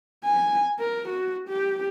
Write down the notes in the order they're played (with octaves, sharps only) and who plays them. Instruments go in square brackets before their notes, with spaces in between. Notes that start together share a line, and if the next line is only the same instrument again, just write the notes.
[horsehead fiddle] G#5
A#4
F#4
G4